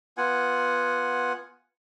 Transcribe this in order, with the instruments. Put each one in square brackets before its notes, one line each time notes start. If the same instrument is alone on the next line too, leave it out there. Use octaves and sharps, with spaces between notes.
[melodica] B3 F4 F#5 G#5